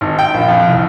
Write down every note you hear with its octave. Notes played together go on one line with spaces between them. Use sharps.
G#1
G5
A#1
F2
C2